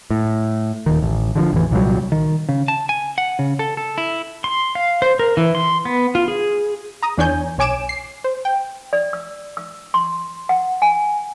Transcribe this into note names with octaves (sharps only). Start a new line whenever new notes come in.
A2
D#1 D#3
A1
D3 D#3 F3
A1 F2 E3
C2 A#2 F#3 G3
D#3
C#3
A5
G#5
F#5
C#3
A4
A4
E4
C6
F5
C5
A#4
E3
C6
B3
F4
G#4
A#5 D#6
E2 E3 D4 C#5 G#5 G6
B1 C#5 G#5 D6 D7 E7
C7
C5
G5
D5
E6
E6
C6
F#5
G#5